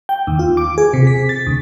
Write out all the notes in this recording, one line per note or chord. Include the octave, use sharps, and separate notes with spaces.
G5
D#2
F4
D6
G#4
C3
B6
A6
D2